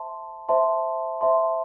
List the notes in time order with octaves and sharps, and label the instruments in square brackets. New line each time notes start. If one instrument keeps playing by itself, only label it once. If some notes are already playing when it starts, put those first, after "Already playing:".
Already playing: [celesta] C5 E5 A5 C6
C5 E5 A5 C6
C5 E5 A5 C6